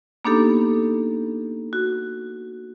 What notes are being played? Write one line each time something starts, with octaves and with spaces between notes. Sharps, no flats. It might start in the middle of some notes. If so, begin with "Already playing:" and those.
A#3 B3 D4 D#4 G4 A4
F#4